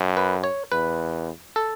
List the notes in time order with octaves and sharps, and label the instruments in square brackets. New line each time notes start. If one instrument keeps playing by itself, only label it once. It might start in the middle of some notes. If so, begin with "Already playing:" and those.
Already playing: [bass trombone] F#2
[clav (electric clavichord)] B4
C#5
[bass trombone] E2 [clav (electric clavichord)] B4
[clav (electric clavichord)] A4